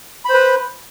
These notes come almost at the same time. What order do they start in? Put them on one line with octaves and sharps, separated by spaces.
B5 C5 B4